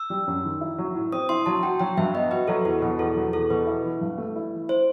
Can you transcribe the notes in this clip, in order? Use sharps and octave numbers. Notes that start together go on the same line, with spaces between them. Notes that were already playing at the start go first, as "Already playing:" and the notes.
Already playing: E6
G3
F#2
D#3
E4
F#3
A2
C4 D#6
E4 C6
F#3 A5
F#4 G5
F#3 G5
G2 E5
B3 D#5
F#4 B4
F#3 A4
E2 B4
B2 B4
E2 A4
F#3
E2 A4
B2 B4
E4
E3
G2
A3
E4
E3
E4 C5